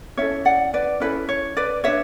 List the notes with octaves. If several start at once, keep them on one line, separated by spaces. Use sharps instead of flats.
C#4 E4 A4 C#5 E5
D5 F#5
B4 D5
C#4 E4 A4 B4 D5
C#5
B4 D5
D4 G#4 B4 C#5 E5